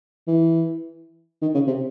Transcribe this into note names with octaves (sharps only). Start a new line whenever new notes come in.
E3
D#3
C#3
C3